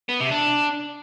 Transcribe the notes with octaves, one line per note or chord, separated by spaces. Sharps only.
B3
C3
D4